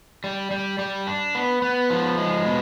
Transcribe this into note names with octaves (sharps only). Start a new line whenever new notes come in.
G3
G3
G3
D4
B3
B3
F3
G#3
B2